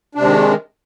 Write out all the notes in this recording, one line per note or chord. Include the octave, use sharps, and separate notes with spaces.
C3 D#3 G#3 D4